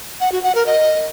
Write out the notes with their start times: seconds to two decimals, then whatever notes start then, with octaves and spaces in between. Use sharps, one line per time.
0.21 F#5
0.32 F#4
0.44 F#5
0.55 A#4
0.66 D#5